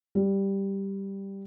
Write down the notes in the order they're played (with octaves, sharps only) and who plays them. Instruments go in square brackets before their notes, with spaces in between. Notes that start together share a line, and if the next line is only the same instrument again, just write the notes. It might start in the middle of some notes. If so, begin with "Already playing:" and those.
[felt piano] G3